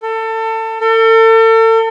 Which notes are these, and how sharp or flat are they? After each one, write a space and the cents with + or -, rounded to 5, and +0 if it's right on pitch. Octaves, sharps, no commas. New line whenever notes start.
A4 +25
A4 +40